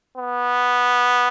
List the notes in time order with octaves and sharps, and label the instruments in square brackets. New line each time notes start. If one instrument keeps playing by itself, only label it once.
[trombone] B3